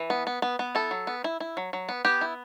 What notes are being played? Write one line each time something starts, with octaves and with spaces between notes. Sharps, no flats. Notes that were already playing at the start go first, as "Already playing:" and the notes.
Already playing: E3
B3
B3
B3
B3
E4 A4
F#3
B3
E4
E4
F#3
F#3
B3
B3 G4
E4